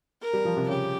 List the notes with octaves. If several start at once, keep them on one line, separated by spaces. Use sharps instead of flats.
A#4
G3
F3
C3
C#3 G4